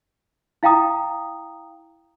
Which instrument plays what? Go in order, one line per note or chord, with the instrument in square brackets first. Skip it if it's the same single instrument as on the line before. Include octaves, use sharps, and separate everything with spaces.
[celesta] E4 F5 G5 A#5 D#6